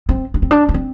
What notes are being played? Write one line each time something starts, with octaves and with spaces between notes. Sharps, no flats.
C4
D4
C4
D4
D4
C4